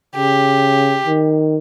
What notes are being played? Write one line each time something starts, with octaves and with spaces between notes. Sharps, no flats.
C#3 G4
D#3